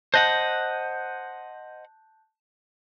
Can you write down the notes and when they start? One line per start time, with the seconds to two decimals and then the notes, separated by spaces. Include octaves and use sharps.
0.14 C5 D#5 F#5 A5 F#6 G6